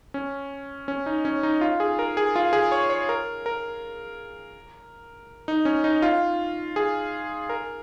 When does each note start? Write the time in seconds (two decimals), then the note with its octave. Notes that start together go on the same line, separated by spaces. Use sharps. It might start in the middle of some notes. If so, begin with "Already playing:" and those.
0.14 C#4
0.88 C#4
1.06 D#4
1.25 C#4
1.43 D#4
1.61 F4
1.80 G#4
1.99 A#4
2.17 G#4
2.36 F4
2.53 G#4
2.72 C#5
2.90 C#5
3.09 A#4
3.46 A#4
5.48 D#4
5.65 C#4
5.84 D#4
6.02 F4
6.76 G#4
7.50 A#4